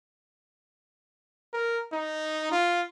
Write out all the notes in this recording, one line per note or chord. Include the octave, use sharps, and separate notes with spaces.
A#4
D#4
F4